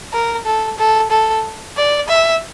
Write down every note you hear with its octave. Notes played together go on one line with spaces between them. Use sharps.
A#4
A4
A4
A4
D5
E5